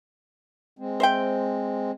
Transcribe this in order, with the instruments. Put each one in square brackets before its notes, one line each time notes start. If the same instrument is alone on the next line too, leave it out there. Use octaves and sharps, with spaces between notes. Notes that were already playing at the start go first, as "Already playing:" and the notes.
[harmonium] G#3 C4
[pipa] C5 E5 G5